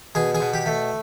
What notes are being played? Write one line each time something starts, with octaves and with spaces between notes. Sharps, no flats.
B2 G#4
G#4
B2
G4
A3